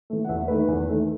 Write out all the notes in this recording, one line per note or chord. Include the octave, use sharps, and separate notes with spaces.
E3 A3
F#5
E2 E5
D#3 A3 B4
E2
D#3 A3